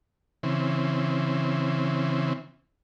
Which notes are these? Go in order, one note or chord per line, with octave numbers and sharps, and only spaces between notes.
C#3 E3 C4